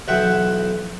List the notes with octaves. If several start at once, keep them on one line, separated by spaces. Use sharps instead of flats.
B1 E3 E5 F#5 G5 D#6